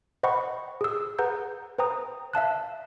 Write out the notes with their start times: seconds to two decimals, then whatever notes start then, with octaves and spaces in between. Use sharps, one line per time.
0.23 C5 D#5 F#5 G5 B5 C#6
0.81 G#4 E6
1.19 G#4 B4 F#5 A#5 G6
1.78 B4 C5 G5 A#5 D#6
2.33 E5 F5 A5 F#6